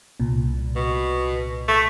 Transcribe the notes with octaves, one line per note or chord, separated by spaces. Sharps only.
C2 A#2
B2
A3